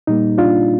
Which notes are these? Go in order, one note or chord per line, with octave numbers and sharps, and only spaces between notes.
A#2 G3 A#3 D#4
D4 F4